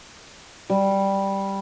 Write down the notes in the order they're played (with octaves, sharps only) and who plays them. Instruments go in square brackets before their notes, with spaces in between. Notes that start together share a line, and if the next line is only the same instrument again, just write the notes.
[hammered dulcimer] G3